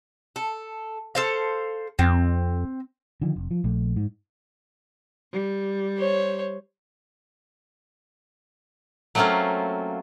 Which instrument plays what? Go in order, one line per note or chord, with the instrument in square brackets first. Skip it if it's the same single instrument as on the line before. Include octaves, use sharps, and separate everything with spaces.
[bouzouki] A4
A4 C5 F5
[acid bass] F2 [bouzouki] C4
[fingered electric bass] D3 D#3 F3
F1
F3
A#1 A3
G#2
[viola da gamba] G3
[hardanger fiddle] C5 C#5
[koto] F#3 A3 A#3 C4 C#4 F4